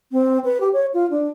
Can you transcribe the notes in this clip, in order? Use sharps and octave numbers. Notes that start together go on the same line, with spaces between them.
C4
B4
G4
C#5
F4
D4